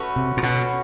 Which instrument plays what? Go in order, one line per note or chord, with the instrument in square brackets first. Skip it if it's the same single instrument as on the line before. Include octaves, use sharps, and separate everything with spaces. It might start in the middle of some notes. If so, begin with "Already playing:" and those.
Already playing: [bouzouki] A3 C#4 F#4 B4
[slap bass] C3
A#2
[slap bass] B2 [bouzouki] A3 C#4 F#4 B4